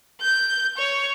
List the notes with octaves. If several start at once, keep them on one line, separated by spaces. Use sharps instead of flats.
G6
C#5